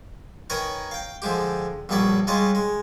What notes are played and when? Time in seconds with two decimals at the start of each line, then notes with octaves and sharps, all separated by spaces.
0.50 D#3 A#4 B4 C#5 G#5 A#5
0.91 F5 G5
1.22 D3 F3 G#3 G4
1.89 A#1 G2 B2 B4 C#5 D5
2.27 G3 G#3 F4 C#5 D#5 F5
2.55 G#3